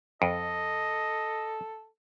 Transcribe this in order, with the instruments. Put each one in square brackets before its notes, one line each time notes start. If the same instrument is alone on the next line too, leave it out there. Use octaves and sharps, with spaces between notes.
[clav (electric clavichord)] F2 [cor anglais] A4 [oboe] D#5